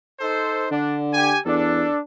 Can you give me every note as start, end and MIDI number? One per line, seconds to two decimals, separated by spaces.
0.20 0.67 63
0.20 0.67 69
0.20 0.67 72
0.71 1.34 50
0.71 0.98 62
1.13 1.38 67
1.13 1.38 80
1.46 1.85 40
1.46 1.97 62
1.46 1.97 69